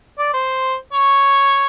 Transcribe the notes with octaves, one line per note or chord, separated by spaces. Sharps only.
D5
C5
C#5